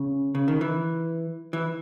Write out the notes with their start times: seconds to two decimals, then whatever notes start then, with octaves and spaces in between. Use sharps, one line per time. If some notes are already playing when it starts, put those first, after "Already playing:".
Already playing: C#3
0.35 C#3
0.48 D#3
0.61 E3
1.53 E3